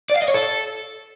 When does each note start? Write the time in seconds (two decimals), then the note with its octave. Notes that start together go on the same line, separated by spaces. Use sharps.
0.10 D5
0.16 F5
0.22 D#5
0.28 C#5
0.34 A4